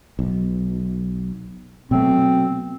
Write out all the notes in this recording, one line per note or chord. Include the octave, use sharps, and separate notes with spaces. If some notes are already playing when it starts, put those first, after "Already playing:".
B1
B2 F#3 A3 C4